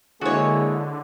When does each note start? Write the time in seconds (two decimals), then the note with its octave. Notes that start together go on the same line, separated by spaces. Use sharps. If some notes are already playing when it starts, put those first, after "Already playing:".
0.21 D3 G#3 A#3 E4 F#4 G#4 C#5